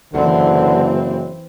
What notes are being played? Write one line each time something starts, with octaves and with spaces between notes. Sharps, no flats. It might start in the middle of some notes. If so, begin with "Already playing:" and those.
F#1 D3 E3 C4